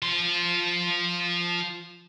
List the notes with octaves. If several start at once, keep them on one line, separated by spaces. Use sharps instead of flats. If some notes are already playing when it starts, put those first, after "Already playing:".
F3 C6